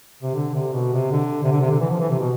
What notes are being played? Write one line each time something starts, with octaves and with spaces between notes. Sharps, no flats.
C3
D3
C3
B2
C3
D3
C3
D3
C3
D3
E3
F3
E3
C3
B2